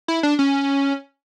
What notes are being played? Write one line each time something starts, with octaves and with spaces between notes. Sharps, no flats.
E4
D4
C#4